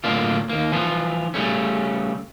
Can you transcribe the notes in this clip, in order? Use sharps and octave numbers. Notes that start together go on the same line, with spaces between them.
F#2 A2 D3 A#3 F4
D#2 A#3
E3 F3 F4
C#3 G3 A3 C#4